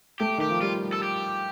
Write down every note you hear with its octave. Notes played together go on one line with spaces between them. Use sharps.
A3 G4
D#3 G4
F3
G3 F4
A4
G4